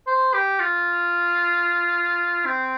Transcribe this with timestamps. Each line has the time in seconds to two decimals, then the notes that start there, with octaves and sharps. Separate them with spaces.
0.08 C5
0.34 G4
0.60 F4
2.46 C4